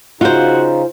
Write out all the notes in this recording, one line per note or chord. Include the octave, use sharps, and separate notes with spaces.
C#3 D#4 F4 F#4 C5